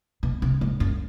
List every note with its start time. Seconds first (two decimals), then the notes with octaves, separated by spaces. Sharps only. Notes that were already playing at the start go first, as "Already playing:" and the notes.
0.23 B2
0.42 C3
0.61 G#2
0.80 F#2